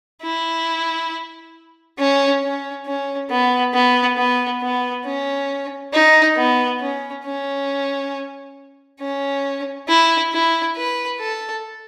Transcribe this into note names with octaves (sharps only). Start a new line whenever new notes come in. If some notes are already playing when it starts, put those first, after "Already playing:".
E4
C#4
C#4
C#4
B3
B3
B3
B3
C#4
D#4
B3
C#4
C#4
C#4
E4
E4
B4
A4